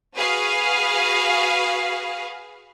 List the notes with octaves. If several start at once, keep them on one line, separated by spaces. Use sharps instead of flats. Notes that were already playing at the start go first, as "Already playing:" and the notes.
F#4 G#4 B4 F5